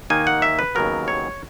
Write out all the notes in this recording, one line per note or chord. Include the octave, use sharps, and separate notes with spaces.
D#2 D#3 A#3 D#4 G#5
F#5
E5
B4
D#2 C#3 F#3 B3 A#4
C#5